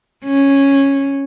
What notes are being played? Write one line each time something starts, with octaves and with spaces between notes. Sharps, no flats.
C#4